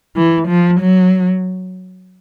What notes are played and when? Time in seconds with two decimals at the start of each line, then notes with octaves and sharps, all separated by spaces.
0.16 E3
0.48 F3
0.80 F#3